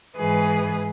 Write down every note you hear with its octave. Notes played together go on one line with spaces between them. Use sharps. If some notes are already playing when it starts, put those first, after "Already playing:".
G#2 E3 G#4 B4